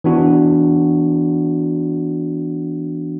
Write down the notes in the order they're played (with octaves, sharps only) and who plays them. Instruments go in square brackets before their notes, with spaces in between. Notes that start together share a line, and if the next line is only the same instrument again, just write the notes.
[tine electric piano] E3 B3 D4 F#4